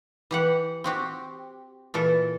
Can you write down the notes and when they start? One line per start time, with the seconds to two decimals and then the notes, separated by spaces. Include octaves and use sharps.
0.31 E3 G4 F#5
0.84 C4 F#4 G4
1.94 A#2 E3 A4